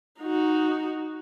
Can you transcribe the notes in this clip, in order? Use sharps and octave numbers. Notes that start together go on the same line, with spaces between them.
D#4 F#4